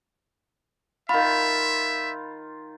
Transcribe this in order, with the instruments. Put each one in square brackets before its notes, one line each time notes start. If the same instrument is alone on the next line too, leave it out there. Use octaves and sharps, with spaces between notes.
[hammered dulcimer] D#3 F4 [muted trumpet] E5 [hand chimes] B5